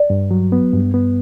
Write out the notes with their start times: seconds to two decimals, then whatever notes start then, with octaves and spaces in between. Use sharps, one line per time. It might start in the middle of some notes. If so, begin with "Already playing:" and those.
Already playing: D5
0.10 G2
0.31 F#3
0.52 B3
0.74 G2
0.94 B3